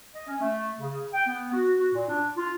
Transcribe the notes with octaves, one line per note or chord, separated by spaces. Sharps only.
D#5
C#4
A3
C#3
G5
B3
F#4
F#4
A#2
D4
F4